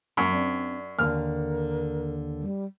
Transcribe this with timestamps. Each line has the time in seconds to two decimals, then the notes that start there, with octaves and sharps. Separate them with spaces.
0.17 F#2 F#3
0.32 C4 D4
0.99 D#2 D3 A#4 F6
2.42 G3